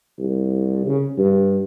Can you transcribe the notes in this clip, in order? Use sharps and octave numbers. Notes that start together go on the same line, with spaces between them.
C2
C#3
G2